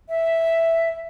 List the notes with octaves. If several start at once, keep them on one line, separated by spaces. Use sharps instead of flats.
E5